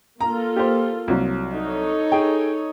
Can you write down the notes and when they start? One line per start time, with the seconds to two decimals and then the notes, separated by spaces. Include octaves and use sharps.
0.21 A#3 F4 A4 A#5
0.56 G4 C5
1.08 C2 F#3
1.54 D#4 A4 C#5
2.12 G#4 G5